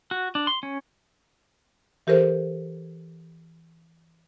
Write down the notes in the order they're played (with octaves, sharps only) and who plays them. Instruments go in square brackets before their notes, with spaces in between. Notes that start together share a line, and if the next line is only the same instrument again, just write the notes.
[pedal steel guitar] F#4
D4
C6
C#4
[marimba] E3 G4 A4 A#4 C5